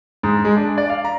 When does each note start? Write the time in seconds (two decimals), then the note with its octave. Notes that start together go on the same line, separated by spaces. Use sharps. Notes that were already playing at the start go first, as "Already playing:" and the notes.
0.23 G#2
0.45 G#3
0.57 D4
0.78 D5
0.89 F5
1.05 A#5